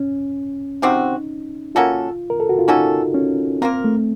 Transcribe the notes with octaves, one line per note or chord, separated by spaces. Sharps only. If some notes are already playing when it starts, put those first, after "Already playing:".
Already playing: C#4
C3 F3 C4 D#4 F#4
A#3 C#4 F4 F#4 A4
A#4
A4
F#4
F4
A#3 C#4 D#4 F#4 A4
C#4
A#3 C4 F4 A#4
A3